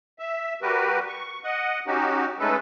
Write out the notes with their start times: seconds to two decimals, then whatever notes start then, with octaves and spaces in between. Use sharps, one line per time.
0.19 E5
0.62 G3 F#4 G4 A#4 B4
1.08 C#6
1.44 D#5 F#5
1.87 C#4 D#4 F#4 G4
2.39 G#3 A3 C#4 D#4 A4 B4